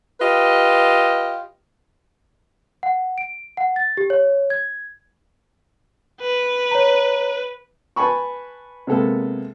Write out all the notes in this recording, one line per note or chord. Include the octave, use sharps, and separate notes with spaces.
F4 G4 B4 D#5
F#5
D7
F#5
A6
G4
C#5
G#6
B4
C#5 A#5
B4 G#5 A5 B5 C#6
C3 G#3 A#3 B3 A4